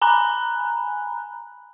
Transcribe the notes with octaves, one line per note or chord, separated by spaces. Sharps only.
G#5 A#5 B5 F#6